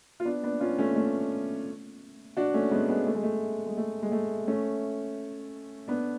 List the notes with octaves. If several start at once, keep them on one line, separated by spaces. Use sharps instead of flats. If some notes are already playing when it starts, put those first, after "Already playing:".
F4
B3 D4
B3 D4
C#4 F4
A3 C#4
A3
D4 F#4
A3 C#4
G#3 B3
G#3 B3
A3
G#3
A3
G#3
A3
G#3
A3
A3 C#4
B3 D4